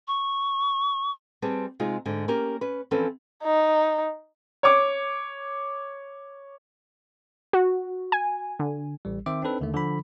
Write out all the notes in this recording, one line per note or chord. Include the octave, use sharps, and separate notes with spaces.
C#6
G3 C4 G#4 B4 A5
C3 G#3 D#4 F4 G#4
G#2 D3
A#3 C#4 G4 A#4
C#4 B4
E3 F3 C4 C#4 A4 B4
D#4
C#5 D6
F#4
G#5
D3
A1 G3
D#3 C4 C5 E5 D6
C4 D4 D#4 A4 B4
D#2 D3 D#3 A3
D3 F3 B5